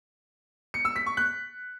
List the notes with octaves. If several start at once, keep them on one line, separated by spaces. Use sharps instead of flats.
C#7
E6
B6
C#6
F#6